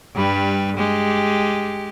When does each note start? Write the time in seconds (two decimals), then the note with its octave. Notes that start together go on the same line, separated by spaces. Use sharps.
0.15 G2 G3 B4
0.77 G#3 G4